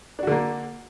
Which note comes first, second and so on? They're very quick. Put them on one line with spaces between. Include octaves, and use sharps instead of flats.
D4 F#4 D3 A#3